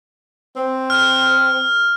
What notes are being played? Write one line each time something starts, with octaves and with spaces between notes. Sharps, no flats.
C4
F6